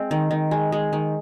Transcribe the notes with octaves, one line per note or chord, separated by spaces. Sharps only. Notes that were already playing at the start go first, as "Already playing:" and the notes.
Already playing: G#3 C4
D#3
D#3
G#3
G#3
D#3